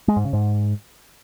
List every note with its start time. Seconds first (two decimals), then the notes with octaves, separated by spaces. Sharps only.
0.08 G#3
0.16 G#2
0.25 C#3
0.33 G#2